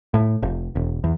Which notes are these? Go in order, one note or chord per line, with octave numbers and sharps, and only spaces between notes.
A2
F1
E1
E2